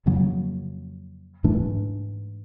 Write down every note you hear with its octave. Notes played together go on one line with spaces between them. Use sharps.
F2 C#3 F#3 A#3
G#2 E3 A3 D4